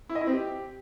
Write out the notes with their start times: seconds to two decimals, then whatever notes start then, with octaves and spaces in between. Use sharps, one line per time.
0.09 E4
0.15 D#5
0.21 E4
0.27 C4
0.33 G4